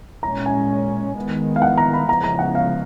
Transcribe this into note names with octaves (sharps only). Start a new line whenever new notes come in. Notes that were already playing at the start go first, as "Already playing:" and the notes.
A#2 G#3 C#4 A#5
G#5
D#3 G#3 B3
F5
F#5
A#5
B5
C#3 F3 G#3 B3 A#5
A#5
F#5
F5